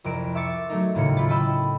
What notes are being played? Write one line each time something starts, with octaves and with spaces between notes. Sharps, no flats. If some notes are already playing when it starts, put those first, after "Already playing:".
C2 F2 A#4 D7
E5 C#6 D6 A6 C#7
F#3 A3 D#4
D#2 A2 C#3 C#7
E4 F4 B5 A6
D#5 G5 B5 C#6 E6